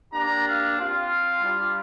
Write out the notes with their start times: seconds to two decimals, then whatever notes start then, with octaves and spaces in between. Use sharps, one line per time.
0.12 A#3 D4 G4 A#5
0.45 F5
0.77 C4 F4 F5
1.42 G3 D4 F4